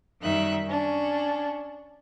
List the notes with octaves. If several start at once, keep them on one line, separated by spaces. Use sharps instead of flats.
F#2 D#3 G3 D#4 E5 F#6
C#4 D4